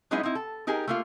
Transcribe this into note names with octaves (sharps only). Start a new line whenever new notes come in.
F#3 G#3 B3 C#4 D#4 E4
C4 D#4 E4
A4
D#4 G4 G#4 A#4
A3 A#3 F4